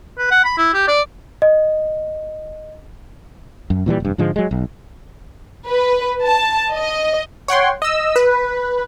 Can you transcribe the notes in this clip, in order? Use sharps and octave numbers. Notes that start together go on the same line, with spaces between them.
B4
F#5
B5
E4
G4
D5
D#5
F#2
A#2 E3 F#3 G3
F1 G2
G#2 D3 F3 G#3
F#3 G#3
B1
B4
A5
D#5
C#5 F#5 G5 C6
D#5 E6
B4